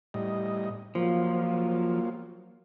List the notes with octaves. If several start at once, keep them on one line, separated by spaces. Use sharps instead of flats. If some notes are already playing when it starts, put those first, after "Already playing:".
A2 G3 D#5
F3 F#3 A#3 F4